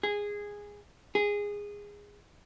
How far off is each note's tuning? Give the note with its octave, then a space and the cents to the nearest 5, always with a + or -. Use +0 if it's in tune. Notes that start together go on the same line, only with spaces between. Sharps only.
G#4 -10
G#4 -15